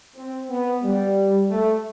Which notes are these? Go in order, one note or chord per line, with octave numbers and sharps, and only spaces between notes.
C4
B3
G3
A3